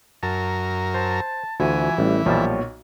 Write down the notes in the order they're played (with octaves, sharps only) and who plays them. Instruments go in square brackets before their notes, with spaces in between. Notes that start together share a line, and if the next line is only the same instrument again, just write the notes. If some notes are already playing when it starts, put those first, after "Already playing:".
[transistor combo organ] F#2 A#4 [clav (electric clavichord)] A5
[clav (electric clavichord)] C5 [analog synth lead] A5
[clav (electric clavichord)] D2 [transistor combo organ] E3 [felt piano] F4 F#4 [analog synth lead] G#5
[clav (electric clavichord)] A1 [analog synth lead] G3
[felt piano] B1 A#2 [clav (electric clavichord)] F3 G3 A5 [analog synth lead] C#5